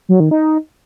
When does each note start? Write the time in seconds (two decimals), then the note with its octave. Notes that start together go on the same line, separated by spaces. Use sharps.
0.09 F#3
0.20 D#3
0.31 D#4